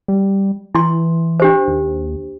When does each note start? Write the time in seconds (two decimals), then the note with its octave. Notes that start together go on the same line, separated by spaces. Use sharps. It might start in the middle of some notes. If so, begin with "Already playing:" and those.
0.08 G3
0.75 E3 E4 C6
1.40 D4 G4 C5
1.68 D#2